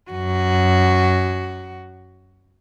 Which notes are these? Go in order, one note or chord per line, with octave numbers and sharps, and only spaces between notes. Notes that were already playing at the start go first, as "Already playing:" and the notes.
F#2 F#4